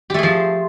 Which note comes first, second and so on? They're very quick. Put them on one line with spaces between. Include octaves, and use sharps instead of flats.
G4 A3 G#4 F3